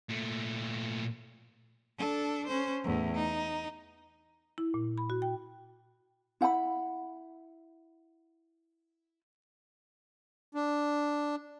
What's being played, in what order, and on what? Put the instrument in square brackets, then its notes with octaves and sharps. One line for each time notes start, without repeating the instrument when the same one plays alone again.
[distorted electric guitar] A#2 A3
[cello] D4 A4
C#4 C5
E2 A2
D#4
[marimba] E4
A#2
B5
F#4
G5
[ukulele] E4 F#5 G5 B5
[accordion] D4